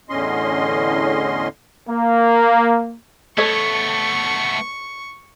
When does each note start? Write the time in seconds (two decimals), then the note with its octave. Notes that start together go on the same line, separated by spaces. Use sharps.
0.10 E2 A2 D3 C#4 D#5 C6
1.89 A#3
3.38 A3 B3 A4 C#5 D#5 C#6